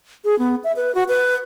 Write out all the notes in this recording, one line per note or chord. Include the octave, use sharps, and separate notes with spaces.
G#4
B3
E5
B4
F#4
B4